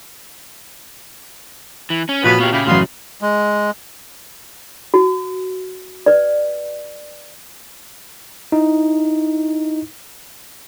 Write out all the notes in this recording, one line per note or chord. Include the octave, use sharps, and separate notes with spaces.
E3
C#4
F2 A#2 B3 C#4 F#4 B4
B3 G4 C#5 F5
C#3 E4 G4 F5
A1 F#2 B3 F5 C6
G#3
F#4
B4 D5
D#4 E4